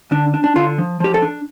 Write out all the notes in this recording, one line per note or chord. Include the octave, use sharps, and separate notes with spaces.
D3 D4
D4
D4
D3 F4
F3
F3 G4
A4
D4